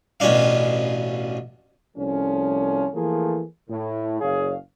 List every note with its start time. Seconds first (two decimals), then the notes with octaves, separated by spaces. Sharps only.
0.20 A1 B2 C#4 D4 F5
1.97 C2 F3 A3 C#4
2.94 E3 F3 A3 A#3 G#4
3.70 A2
4.21 F#1 G#4 C#5 F5